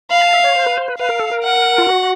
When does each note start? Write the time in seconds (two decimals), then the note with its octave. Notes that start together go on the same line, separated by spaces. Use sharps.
0.10 F5 B5
0.21 A5
0.33 E5
0.44 C#5
0.55 C5
0.66 B4
0.77 C5
0.88 B4
0.98 B4 F5
1.09 A#4
1.20 A4
1.31 A#4
1.43 F#5
1.78 F4
1.87 F#4